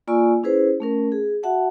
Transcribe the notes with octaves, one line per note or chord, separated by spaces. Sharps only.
A#3 F4 D5 G#5 C#6 E6
C#4 E4 G#4 B4 C5
A3 C#4 A#4
G#4
F#4 E5 F#5 A5